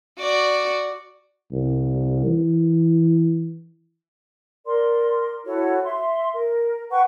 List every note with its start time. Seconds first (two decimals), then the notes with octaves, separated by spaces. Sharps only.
0.20 F#4 D5
1.52 C2
2.27 E3
4.66 A#4 D5 C6
5.45 E4 F#4 A4 C#5
5.85 E5 C6
6.33 A#4
6.91 B4 F#5 G5 C#6